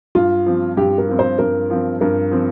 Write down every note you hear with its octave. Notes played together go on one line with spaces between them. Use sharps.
G2 F4
F3 C4
G2 G4
A#4
F3 C4
C5
G2 A#4
F3 C4
G2 A#4
F3 C4